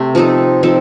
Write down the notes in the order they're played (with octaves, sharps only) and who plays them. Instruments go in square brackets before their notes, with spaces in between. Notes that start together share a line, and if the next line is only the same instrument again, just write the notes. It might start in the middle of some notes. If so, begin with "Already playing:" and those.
Already playing: [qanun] C3 A3
F3 C4 D#4 A4
F3 C4 D#4 A4